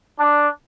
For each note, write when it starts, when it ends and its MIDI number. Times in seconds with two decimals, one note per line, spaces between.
0.19 0.47 62